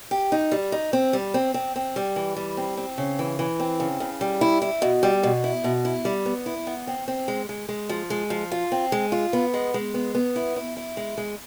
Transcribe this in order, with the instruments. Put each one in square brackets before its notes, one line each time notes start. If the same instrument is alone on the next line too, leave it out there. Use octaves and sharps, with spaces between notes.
[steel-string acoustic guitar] G4
D#4
G3
D#4
C4
G3
C4
C4
C4
G3
E3
G3
C4
C4
C#3
E3
E3
C4
C#3
C#3
G3
E4
E4
B2
G3
B2
E4
B2
E4
G3
B3
E4
B3
C4
C4
G#3
G#3
G#3
F3
G#3
F3
F4
C4
G#3
F4
B3
G#3
G#3
B3
B3
E4
E4
E4
G#3
G#3